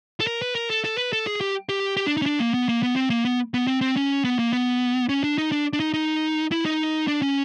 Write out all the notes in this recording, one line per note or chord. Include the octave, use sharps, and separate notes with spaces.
A4
A#4
B4
A#4
A4
A4
B4
A4
G#4
G4
G4
G4
D4
D#4
C#4
D4
A#3
B3
A#3
B3
C4
A#3
B3
B3
C4
C4
C#4
B3
A#3
B3
C#4
D4
D#4
D4
D4
D#4
D#4
E4
D#4
D4
C#4